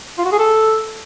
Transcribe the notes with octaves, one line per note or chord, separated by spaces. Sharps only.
F4
F#4
G#4
A4